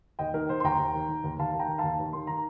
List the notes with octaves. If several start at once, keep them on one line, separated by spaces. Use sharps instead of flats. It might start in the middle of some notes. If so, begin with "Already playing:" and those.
D#2 D#5 G5
D#3 A#4
D#3 C5
C6
D#2 G5 A#5
D#2
D#3
D#3
D#2
D#2 F5 A5
D#3
G5 A#5
D#3
D#2 F5 A5
D#2
D#3 C6
D#3 A#5